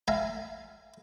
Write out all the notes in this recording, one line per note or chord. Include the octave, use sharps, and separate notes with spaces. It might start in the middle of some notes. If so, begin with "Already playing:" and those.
E5 F5 G#5 A#5